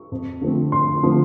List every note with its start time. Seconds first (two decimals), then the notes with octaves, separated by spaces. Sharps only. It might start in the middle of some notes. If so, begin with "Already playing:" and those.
Already playing: C#6
0.12 F2
0.41 D3 F3 A3 C4
0.72 F2 C6
1.03 D3 F3 A3 C4